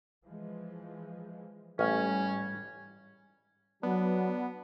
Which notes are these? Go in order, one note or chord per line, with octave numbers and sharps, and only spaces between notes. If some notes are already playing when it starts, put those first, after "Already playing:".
E3 F3 G#3
A1 G#2 G3 C#4
F#3 B3 D4